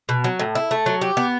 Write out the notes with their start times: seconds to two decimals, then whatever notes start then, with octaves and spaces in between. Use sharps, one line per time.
0.09 B2
0.24 F#3
0.39 A2
0.55 E4
0.71 A3
0.86 F#3
1.01 G4
1.17 B3